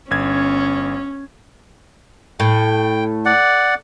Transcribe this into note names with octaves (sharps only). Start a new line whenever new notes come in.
G1 C#4 G#6
A2 G5
D5 F#5